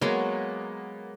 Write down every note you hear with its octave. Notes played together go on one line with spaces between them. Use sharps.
F#3 G#3 A#3 B3